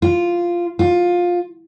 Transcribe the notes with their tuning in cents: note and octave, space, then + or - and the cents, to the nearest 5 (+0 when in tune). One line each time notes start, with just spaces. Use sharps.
F4 -5
F4 +15